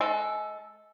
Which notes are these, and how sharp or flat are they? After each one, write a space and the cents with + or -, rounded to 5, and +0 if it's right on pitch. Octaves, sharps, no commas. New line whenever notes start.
G#3 +25 A4 +0